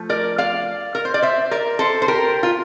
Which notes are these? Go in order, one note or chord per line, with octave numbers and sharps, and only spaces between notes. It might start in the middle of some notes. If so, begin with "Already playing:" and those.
Already playing: F3 A3
A#4 D5
D5 F5
A#4
C5
D5
C5 E5
A#4 D5
A4 C5
C5
G4 A#4
F4